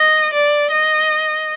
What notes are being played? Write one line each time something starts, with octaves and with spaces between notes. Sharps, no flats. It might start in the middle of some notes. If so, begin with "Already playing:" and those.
Already playing: D#5
D5
D#5